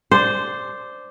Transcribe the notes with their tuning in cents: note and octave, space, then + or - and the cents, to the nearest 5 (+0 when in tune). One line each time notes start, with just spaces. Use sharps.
D4 +0 C5 -10